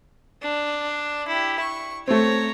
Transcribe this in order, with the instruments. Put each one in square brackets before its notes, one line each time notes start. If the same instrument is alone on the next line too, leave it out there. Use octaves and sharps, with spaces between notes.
[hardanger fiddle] D4
E4 G4
C#6
[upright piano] A3 C4 [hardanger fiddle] C#5 A#5